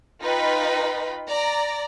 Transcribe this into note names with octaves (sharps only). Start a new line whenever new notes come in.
D#4 F4 B4 G5 B5
D5 A#5